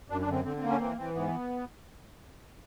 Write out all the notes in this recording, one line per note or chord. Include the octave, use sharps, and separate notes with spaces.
F#2 D4
D4
D3 C4
D3 C4
C4
A#3
C#4
E3 C4
E3 C4
G#2 B3